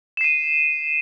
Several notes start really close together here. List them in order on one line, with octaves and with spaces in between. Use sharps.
E7 C7 D#7